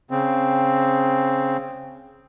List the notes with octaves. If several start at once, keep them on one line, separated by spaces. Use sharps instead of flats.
C#3 C4